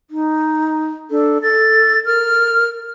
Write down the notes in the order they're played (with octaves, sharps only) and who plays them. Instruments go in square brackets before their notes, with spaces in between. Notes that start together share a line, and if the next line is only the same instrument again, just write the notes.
[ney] D#4
[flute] D4 [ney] A4
[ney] A4 [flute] A6
[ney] A#4 [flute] F6